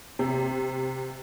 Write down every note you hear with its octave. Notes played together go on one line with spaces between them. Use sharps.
C3